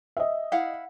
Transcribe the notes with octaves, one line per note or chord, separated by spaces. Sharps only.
D#5 E5
E4 F5 F#5